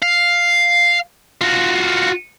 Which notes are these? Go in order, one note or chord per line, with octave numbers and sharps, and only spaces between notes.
F5
F4 F#4